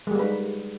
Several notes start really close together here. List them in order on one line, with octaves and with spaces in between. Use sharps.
G#3 G3 A#3 B4 D#4